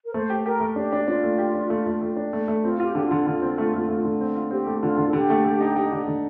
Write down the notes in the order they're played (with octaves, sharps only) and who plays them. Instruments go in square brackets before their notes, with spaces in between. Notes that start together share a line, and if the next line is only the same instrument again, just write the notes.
[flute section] A#4
[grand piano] A3 [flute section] C5
[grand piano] G4
[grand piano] G4 [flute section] A#4
[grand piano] A3
[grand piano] D4 [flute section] G4
[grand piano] D4
[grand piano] D4 [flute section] F4
[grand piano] A3
G4
D4
A3
A3
A3
D4
A3
A3
[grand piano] C4 [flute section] F4
[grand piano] F4
[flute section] G4
[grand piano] D3 [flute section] G4
[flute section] F4
[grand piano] D3
D3
C4
A3
A3
A3
D3
C4
F4
[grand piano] C4 [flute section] G4
[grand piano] A3
[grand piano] D3 [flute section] F4
[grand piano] D3
[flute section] A4
[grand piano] D3 [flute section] G4
[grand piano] A3
A3
D#4
D#4
D3
D3